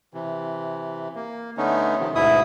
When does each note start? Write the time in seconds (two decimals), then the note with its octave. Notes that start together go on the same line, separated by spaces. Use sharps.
0.14 C3 E3
1.15 A#3
1.57 D3 A3 B3 C#4 D#4
1.99 C3 D#3 F3
2.15 D2 G#2 B2 E4 E5 D#6